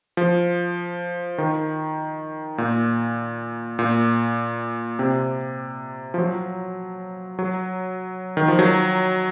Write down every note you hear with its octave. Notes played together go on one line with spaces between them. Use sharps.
F3
D#3
A#2
A#2
C3
F3
F#3
F#3
D#3
F3
F#3